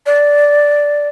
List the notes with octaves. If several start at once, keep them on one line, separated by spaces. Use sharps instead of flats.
D5